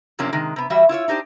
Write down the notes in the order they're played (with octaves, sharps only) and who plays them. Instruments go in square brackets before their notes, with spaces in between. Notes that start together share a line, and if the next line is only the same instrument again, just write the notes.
[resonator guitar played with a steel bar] F#2 C3 F3 A#3 C#4 D4
C3 D#3 G#3
C3 B3
E3 G3 F#4 C#5 E5
E4 F4 C5 C#5
D4 D#4 G4 C5